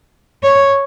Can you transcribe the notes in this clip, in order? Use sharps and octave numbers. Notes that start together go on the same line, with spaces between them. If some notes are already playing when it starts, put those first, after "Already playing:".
C#5